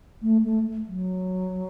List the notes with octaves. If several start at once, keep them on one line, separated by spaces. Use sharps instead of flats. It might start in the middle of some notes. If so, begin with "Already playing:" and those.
A3
A3
F#3